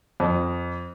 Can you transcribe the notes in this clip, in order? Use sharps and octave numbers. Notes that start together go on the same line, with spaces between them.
F2